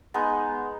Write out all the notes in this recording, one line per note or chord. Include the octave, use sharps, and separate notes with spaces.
G#3 B3 D#4